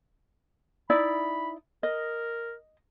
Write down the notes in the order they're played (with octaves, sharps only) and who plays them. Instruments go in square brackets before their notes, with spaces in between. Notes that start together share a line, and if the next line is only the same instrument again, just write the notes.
[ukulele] D#4 E4 D5 [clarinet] B5
[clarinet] A#4 [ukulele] D#5